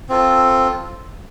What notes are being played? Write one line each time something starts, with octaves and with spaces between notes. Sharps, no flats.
C4 F4 A4